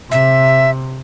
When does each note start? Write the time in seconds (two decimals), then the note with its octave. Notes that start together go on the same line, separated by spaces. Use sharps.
0.11 C3 E5